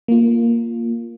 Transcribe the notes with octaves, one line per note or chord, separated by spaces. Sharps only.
A#3 F4